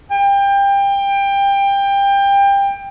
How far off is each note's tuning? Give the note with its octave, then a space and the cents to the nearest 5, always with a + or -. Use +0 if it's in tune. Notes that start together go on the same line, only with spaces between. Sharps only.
G5 +25